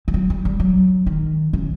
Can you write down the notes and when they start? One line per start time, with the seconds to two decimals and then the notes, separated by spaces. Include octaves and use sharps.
0.08 F3
0.14 F#3
0.30 G3
0.45 G3
0.60 F#3
1.06 D#3
1.53 C#3